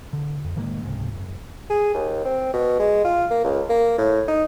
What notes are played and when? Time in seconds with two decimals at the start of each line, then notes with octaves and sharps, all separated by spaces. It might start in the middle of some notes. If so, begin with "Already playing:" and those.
0.13 D3
0.44 F2
0.56 A2 D#3 G#3 A#3
0.83 C#2 G#2 C3
1.14 F#1
1.70 G#4
1.94 D#2
2.25 C4
2.53 B2
2.79 G#3
3.04 F4
3.30 A#3
3.44 C#2
3.69 A#3
3.98 A2
4.28 D#4